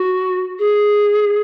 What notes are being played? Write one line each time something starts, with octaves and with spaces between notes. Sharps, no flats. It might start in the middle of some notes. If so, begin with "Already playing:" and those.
Already playing: F#4
G#4